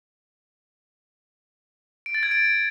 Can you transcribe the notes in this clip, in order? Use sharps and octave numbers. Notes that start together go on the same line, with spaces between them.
D7
A6
G#6
D7